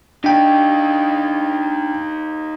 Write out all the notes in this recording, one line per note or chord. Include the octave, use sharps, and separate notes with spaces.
D4 D#4 G4 G5